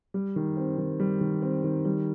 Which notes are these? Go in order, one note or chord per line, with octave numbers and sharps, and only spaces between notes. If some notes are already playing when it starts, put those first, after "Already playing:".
G3
D#3
C4
D#3
G3
D#3
C4
D#3
G3